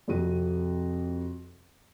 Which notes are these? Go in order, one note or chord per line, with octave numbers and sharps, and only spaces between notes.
F2 C3 F#4 D#7